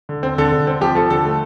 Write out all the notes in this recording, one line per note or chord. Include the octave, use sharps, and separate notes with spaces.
D3
C4
D3 A4
D3
C4
F3 G4
F3 A4
D3 A4
A3